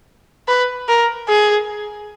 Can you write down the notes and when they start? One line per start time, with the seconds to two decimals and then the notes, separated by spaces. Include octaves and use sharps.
0.48 B4
0.88 A#4
1.29 G#4